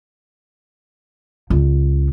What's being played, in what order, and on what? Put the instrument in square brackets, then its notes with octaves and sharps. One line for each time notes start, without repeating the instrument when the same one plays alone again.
[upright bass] C#2